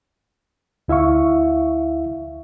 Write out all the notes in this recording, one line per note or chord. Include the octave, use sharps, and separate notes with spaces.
D2 E4 E5 F5 C#6